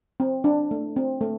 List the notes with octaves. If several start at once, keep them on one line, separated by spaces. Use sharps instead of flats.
C4
D4
A3
C4
A3